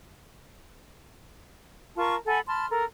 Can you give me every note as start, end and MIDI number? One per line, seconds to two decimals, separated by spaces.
1.97 2.15 65
1.97 2.15 70
1.97 2.15 81
1.97 2.15 85
2.27 2.40 69
2.27 2.40 78
2.27 2.40 80
2.27 2.40 83
2.47 2.66 81
2.47 2.66 83
2.47 2.66 84
2.47 2.66 89
2.71 2.84 69
2.71 2.84 70